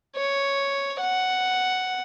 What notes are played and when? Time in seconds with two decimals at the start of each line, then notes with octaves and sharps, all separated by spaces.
0.17 C#5
1.01 F#5